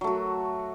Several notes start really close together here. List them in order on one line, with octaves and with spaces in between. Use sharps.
F#3 A3 F#4